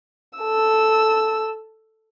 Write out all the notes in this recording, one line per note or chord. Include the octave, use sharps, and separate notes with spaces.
A4 E6